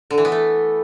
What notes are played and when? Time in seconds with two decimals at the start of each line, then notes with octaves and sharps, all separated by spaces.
0.11 D3
0.18 E3
0.25 B3
0.32 A3